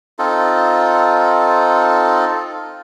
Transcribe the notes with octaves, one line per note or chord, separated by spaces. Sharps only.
C4 D#4 F4 A4